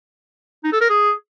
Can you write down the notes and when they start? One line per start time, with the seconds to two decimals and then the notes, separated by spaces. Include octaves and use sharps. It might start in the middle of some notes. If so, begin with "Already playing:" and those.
0.64 D#4
0.72 A4
0.81 A#4
0.89 G#4